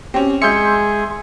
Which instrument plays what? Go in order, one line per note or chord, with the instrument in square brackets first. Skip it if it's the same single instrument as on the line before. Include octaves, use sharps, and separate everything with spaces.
[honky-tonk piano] C4 C#4 [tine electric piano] G4
[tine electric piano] G#3 C#7 [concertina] G#4 [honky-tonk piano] E5 G6 [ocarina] C6